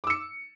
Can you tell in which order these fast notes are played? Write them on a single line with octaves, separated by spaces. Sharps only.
D6 E6 C#7